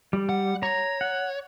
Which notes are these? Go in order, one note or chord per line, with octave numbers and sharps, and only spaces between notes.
G3
F#5
C#5 A#5
F#5